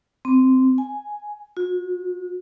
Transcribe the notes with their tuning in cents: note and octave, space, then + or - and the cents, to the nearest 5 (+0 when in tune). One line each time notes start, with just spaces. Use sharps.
C4 -10
G#5 +0
F#4 -40